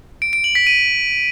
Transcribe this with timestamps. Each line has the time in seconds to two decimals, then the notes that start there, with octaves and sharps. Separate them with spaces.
0.22 D7
0.33 D7
0.44 F#7
0.55 B6
0.67 D#7